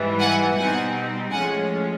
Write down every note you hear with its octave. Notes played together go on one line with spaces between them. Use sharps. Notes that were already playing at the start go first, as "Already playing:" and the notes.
Already playing: G#2 E3 G3
F#5 G#5
B2 G3 C4 D#4 F#5 G#5
A2 F3 G#3 C#4 F#5 G#5